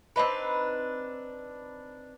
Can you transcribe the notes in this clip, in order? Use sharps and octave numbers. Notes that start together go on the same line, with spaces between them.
C4 D4 D#4 B4